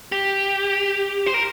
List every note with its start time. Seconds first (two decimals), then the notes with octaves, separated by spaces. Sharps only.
0.12 G4
1.26 C5
1.34 A#4